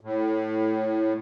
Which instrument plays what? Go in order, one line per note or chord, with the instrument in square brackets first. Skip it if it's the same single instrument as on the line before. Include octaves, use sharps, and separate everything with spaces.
[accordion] A2